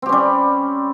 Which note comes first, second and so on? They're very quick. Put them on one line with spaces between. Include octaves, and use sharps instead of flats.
C4 G4 C#4 G3